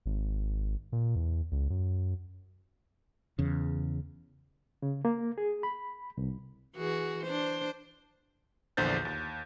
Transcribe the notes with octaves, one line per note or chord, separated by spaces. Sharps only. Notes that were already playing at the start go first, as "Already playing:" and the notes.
G#1
A#2
E2
C#2
F#2
E2 C#3
C#3
A#3
G#4
B5
C2
E3 F#4 G#4
D4 C5
A#1 E2 D3 C5 G6 A6
D#2